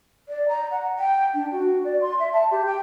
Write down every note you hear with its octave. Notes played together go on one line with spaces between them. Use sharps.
D5
A#5
F#5
G5
D4
F#4
D5
C6
E5
A5
G4
G5